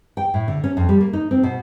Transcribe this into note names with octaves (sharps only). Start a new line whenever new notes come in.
G5
A2
D3
C#4
F2
G3
A#3
D#4
C4
B2